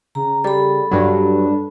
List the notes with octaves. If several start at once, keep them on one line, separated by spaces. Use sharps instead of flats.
C#3 A#5
G3 A4 B5
G2 F#3 D4